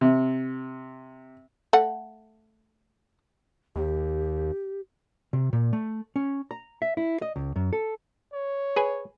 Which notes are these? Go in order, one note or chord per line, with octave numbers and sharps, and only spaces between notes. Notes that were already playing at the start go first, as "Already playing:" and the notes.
C3
A3 F#5
D#2 G4
C3
A#2
A3
C#4
A#5
E5
E4
D#5
C#2
F#2
A4
C#5
G#4 B4 G#5